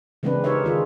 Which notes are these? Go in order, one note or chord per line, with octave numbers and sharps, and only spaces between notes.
C#3 E3 G#3 C4 D4 B4
D#4 G4 A#4 C5 C#5 E5
D#3 F4 G#4